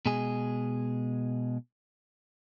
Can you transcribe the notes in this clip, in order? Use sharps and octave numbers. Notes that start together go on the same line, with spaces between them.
B2 G#3 G#4